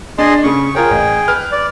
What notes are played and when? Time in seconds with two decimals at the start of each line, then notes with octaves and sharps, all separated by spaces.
0.18 D4 G#4 D#5 C6
0.44 C#3 C#4 C#6
0.75 F4 G#4 A#4 C#5 G5
0.91 A1
1.28 B4 F6
1.52 D5